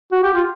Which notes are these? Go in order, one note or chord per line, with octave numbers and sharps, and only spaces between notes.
F#4
G4
F4